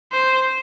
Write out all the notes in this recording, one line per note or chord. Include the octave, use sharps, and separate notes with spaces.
C5